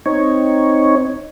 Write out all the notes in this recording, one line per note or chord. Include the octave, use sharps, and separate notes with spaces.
C4 D#4 C#5